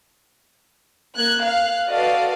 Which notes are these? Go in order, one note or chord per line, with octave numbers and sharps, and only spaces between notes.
A#3 F#6 G#6
F5 F#6
F#4 A4 B4 D5 D#5 F5